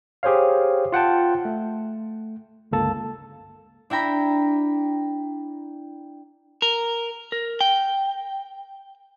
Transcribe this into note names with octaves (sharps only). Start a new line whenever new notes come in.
G4 G#4 C5 C#5 F5
F4 F#5 G5 A5
A3
G1 C#2 A#3 A4 A5
D4 E4 G5 A#5 B5
A#4
A#4
G5